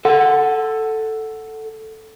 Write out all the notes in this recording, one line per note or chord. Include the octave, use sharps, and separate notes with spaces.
A4 F#5